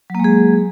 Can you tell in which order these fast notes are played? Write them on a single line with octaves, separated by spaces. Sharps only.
F#3 A#3 G#3 G#4